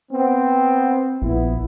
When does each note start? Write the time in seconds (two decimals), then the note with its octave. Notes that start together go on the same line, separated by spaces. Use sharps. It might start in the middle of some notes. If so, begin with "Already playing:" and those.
0.11 B3 C4
1.22 A#1 B3 E4